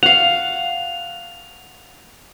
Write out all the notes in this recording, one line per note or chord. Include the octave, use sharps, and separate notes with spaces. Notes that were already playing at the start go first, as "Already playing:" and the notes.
F5 F#5 F7